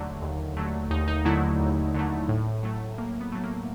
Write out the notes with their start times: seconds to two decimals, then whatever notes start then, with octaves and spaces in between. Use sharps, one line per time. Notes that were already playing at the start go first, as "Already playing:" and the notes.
Already playing: D#2 D3 F#3 A3
0.22 D#2
0.57 D3 F#3 A3
0.90 D#2 D#4
1.08 D#4
1.25 D3 F#3 A3 E4
1.59 D#2
1.94 D3 F#3 A3
2.29 A2
2.63 F#3 A3
2.98 A2 A#3
3.21 B3
3.32 F#3 A3
3.44 A#3